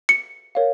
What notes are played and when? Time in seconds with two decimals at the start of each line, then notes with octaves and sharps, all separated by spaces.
0.09 C#7
0.55 A#4 C#5 F5